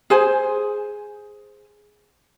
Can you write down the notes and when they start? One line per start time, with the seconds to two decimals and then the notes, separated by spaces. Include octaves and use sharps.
0.10 G#4 C5 G#5